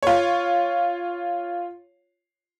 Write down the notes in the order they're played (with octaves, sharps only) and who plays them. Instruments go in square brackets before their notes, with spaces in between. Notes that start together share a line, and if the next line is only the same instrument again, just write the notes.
[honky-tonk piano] F4 C#5